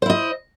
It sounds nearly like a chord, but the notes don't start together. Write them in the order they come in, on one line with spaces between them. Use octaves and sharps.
C5 E4 D#5